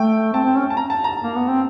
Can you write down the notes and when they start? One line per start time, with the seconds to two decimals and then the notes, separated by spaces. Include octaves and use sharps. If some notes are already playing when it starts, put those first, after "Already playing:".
Already playing: A3 G5
0.33 C4 A5
0.45 C4
0.56 C#4
0.70 A5
0.77 A#5
0.90 A5
1.04 A#5
1.23 A#3
1.36 B3
1.49 C4